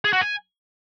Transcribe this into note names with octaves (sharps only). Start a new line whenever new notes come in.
G#4
F#4
G#5